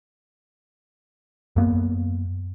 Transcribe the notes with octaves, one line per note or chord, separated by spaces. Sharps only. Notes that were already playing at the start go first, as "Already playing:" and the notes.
F#2 A#3 B3